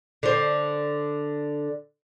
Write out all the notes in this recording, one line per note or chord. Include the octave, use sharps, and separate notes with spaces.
D3 C5